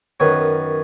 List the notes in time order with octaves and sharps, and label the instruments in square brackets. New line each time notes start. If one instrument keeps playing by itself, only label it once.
[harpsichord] F#2 D#3 B3 C#5